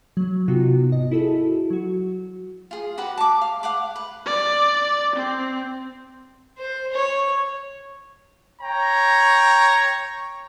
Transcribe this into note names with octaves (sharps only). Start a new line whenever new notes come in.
F#3
C3 B3 D#4 F4 F#4
G#1 D#5
E4 F#4 G#4 A4 A5
F#3 F#4
F4 G#4
F#4 G4 B4 F#5
A5 D6
F5
F5 F#5 D6
B4
D5
C4
C5
C#5
C#5 G5 A#5